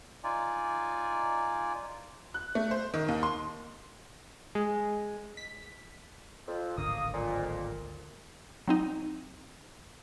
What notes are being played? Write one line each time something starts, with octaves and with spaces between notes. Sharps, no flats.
D#4 F4 D5 G#5
F#6
A3
C5
D#3
D#2
C6
G#3
B6
F2
D1 G#1 D3 A#3 D#6
F2 A#2
F#3 C4 D#4